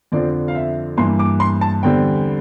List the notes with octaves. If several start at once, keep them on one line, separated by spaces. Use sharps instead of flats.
F2 D3 F3 C4 D5
F5
E5
G2 E3 A#3 C6
D6
C6
A5
E2 D3 G3 C4 G5